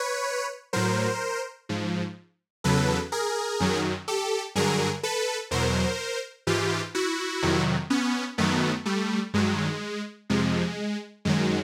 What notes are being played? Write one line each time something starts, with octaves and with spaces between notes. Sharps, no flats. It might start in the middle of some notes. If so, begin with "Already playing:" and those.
Already playing: B4 C#5
A2 F#3 A#4 C5
G#2 F3
E2 C#3 F#3 A4 B4
G#4 A#4
F#2 D#3 F#3
G4 A4
G2 D3 F#3 G#4 A#4
A4 B4
E2 B2 F#3 A#4 C5
G#2 E3 F4 G4
E4 F#4
F2 C3 D#3 F#3
B3 C#4
F#2 D#3 F#3 A3 B3
G3 A3
G2 D#3 F#3 G#3
F2 C3 F3 G#3
F#2 D#3 F#3 G#3